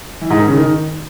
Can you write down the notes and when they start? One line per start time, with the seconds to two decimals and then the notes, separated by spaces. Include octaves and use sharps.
0.21 E3
0.30 G#2
0.39 D#3
0.48 C#3
0.57 D#3